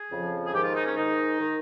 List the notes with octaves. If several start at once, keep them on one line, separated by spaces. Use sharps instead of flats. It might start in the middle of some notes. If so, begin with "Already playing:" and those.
Already playing: G#4
F2 C#3 F3
G#4
G#2 D#3 G4
F4
D#4
C#4
G#2 D#3 D#4
D#3